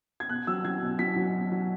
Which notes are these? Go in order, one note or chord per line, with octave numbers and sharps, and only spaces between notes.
G#6
B2 F#6
F#3 E6
F#3 G#6
B2
F#3 B6
F#3
B2
F#3